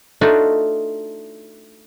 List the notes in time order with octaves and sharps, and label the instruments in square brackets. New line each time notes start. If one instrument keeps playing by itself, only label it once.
[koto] A3 D4 D#4 F4 F#4